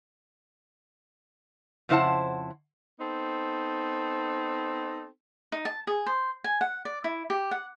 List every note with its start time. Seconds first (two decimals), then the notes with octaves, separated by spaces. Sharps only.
1.89 F2 C#3 E4 C5 F#5 A5
2.99 B3 C4 D#4 A4
5.52 D#4
5.65 A5
5.87 G#4
6.06 C5
6.44 G#5
6.61 F#5
6.85 D5
7.04 E4
7.30 G4
7.51 F#5